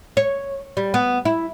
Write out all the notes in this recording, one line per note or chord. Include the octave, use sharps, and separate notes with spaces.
C#5
G3
B3
E4